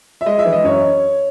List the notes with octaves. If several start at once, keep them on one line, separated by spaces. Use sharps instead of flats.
E5
G#3 D#5
E5
E3
D#5
F#2 C#5